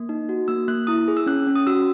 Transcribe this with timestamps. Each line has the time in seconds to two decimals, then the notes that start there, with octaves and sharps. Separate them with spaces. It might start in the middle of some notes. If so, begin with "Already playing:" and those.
Already playing: A#3
0.09 D#4
0.29 F#4
0.48 A#3 E6
0.68 A#3 F#6
0.87 E4 D#6
1.08 G#4
1.17 E6
1.26 C#4 F#6
1.47 C#4
1.56 D#6
1.67 F#4 E6